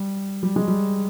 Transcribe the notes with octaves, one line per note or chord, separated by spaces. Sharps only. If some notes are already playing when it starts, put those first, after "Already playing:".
Already playing: G3
G3
G#3
G3